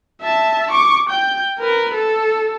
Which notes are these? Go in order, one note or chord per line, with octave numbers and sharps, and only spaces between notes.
E5 A5
C#6 D6
G5 G6
A#4 B4
A4